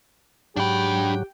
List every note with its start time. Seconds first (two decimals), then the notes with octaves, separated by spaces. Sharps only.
0.56 G#2 F#3 D4 G4 G5 B5